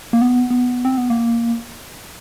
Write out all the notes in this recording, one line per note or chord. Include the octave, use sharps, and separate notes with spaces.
A#3
B3
B3
C4
B3
A#3